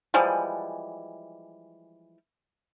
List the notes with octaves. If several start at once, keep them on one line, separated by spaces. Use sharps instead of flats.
E3 F3 G3 G#3